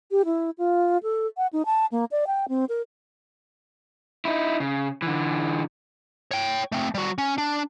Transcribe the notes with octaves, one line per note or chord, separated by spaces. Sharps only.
G4
E4
F4
A4
F#5
D#4
A5
A#3
D5
G5
C4
A#4
D#4 E4
C#3
D3 E3
C#5 G5
A3 C4
G3 F#4
C#4
D4